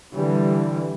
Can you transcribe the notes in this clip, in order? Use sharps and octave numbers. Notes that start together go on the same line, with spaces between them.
D3 E3 G3